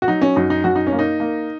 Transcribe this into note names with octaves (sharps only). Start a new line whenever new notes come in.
F#4
F#3 D#4
C#4
F#2 D#4
D#4
F#2 F#4
D#4
C#4
A#3
D#4
A#3